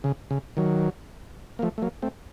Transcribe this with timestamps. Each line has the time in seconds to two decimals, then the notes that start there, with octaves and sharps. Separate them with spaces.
0.04 C#3
0.31 C#3
0.57 D#3 F#3
1.59 A#3
1.62 F3 A3
1.78 A3
1.82 F#3 A#3
2.02 A3 C4